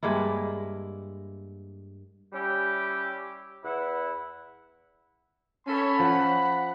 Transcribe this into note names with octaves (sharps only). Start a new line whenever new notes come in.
G2 G#3 A#3 E4
G3 C#4 E4 G4
E2 E4 F#5
C#4 A4 C#5 B5
F3 F#5